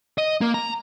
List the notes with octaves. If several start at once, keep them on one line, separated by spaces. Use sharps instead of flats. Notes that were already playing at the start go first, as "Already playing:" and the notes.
D#5
A#3
A#5